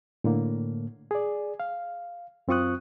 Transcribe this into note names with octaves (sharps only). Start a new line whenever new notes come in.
A2 D3 A#3
G#4 D5
F5
F#2 C4 F4 C#6 D#6 F#6